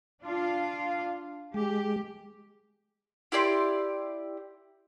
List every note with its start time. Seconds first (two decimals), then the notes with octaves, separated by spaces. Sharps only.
0.24 D4 F4 F5
1.54 G#3 G4
3.32 E4 G4 D5 C6